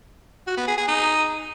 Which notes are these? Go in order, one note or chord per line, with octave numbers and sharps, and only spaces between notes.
F#4
B3
G#4
G#4
D#4